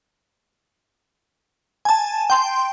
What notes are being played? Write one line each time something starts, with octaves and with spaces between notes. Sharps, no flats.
G#5 A5
G5 C6